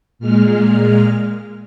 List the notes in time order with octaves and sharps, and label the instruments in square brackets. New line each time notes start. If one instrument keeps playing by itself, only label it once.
[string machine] A#2 G#3 F6